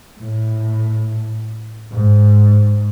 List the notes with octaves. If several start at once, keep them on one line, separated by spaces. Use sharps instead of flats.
A2
G#2